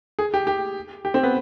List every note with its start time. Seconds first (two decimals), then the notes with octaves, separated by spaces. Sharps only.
0.19 G#4
0.34 G4
0.47 G4
1.05 G4
1.14 C4
1.23 B3